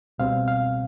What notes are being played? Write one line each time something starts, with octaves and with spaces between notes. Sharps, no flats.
C#2 B2 G3 C4 F5
F5